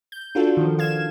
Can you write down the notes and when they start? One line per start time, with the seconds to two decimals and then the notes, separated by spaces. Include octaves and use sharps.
0.12 G6
0.35 D4 F4 F#4 A4
0.57 D#3 F3
0.79 F5 G#6 E7